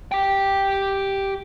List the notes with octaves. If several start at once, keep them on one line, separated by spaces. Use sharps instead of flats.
G4 G5